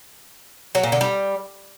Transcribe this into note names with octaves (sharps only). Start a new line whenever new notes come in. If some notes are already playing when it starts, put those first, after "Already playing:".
F#3
A#2
D3
G3